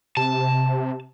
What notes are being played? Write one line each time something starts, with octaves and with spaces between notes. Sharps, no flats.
C3 A5